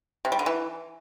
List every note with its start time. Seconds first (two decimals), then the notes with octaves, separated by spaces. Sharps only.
0.25 C3
0.32 G3
0.39 D3
0.46 E3